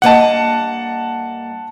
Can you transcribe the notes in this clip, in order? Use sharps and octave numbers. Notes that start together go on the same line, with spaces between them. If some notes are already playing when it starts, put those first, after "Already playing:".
G2 A#3 D#5 F#5 A5